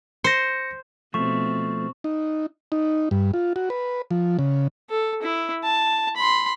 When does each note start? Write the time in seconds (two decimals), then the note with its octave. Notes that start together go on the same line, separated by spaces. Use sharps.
0.24 C5 A#6 C#7
1.14 B2 F3 A3 C4 C#6
2.04 D#4
2.72 D#4
3.11 G2
3.34 F4
3.56 F#4
3.70 B4
4.11 F3
4.39 C#3
4.90 A4
5.23 E4
5.64 A5
6.17 B5 C6